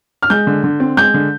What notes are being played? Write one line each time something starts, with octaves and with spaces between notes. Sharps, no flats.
F6
G#3 G6
D3
D3
C4
G#3 G6
D3